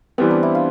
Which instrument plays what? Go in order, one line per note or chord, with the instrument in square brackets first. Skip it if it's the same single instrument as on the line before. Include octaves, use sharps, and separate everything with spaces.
[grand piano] E3 G3 B3 [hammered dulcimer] C4
[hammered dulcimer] D4
E4
F4